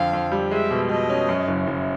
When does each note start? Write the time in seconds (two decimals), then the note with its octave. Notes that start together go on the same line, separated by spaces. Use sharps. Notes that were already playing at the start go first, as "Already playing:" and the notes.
Already playing: F2 D3 F5
0.13 F2
0.32 G3
0.51 G#3 E5
0.71 B2
0.89 B2 D#5
1.09 C#4
1.29 F#2
1.48 F#1
1.67 F#1